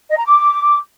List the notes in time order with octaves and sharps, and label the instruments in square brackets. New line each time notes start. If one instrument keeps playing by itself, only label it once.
[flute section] D#5
A#5
D6